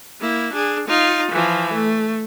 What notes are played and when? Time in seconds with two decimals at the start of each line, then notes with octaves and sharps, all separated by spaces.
0.20 A#3 E4
0.53 D4 G#4
0.88 D#4 F4
1.31 E3 F3
1.73 A3